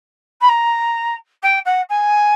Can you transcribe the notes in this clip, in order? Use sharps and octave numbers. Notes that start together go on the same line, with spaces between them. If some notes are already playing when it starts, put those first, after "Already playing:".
B5
A#5
G5
F#5
G#5